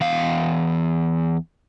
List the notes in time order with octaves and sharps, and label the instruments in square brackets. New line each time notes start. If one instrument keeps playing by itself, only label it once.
[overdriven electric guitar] E2 F5